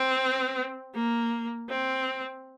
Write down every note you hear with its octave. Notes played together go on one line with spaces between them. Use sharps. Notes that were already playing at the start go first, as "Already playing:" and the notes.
Already playing: C4
A#3
C4